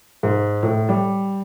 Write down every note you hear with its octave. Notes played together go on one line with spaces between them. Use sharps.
G#2
A2
G3